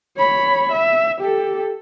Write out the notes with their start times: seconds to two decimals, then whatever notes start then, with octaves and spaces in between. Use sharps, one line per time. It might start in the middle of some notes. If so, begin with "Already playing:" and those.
0.17 C#5 B5
0.72 E5
1.21 G4 A4